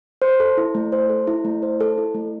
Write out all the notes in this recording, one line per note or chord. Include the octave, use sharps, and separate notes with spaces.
C5
A4
E4
A3
C5
A4
E4
A3
C5
A4
E4
A3